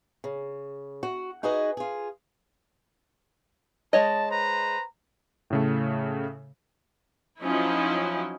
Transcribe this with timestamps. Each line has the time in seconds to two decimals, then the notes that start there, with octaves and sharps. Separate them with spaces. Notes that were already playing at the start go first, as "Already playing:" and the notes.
0.24 C#3
1.03 F#4
1.43 D#4 F#4 G#4 B4 D#5
1.77 F4 G#4
3.93 G#3 C#5 D#5 A5
4.29 B4 C5 A#5
5.50 A2 C#3 A3
7.40 F3 F#3 C#4 D#4 E4